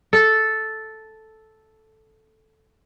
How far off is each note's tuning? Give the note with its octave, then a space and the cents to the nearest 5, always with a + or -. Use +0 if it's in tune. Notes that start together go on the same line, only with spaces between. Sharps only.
A4 -5